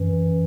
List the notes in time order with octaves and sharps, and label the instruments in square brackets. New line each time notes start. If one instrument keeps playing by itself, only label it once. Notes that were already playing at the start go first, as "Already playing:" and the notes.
Already playing: [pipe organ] F#2 E3